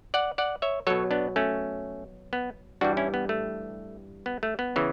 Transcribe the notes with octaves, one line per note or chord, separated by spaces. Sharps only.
D5 F#5
D5 F#5
C#5 E5
B2 F#3 A4 C#5
B3 D4
A3 C#4
B3
G2 E3 G3 D4 F#4
C#4 E4
B3
A3
B3
A3
B3
C#3 E3